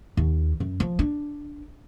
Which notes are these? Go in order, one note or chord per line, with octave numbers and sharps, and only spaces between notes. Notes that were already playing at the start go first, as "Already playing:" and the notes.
D#2
F#2
F3
D4